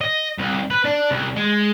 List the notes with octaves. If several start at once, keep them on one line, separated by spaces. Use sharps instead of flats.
D#5
C2
B4
D4
C2
G#3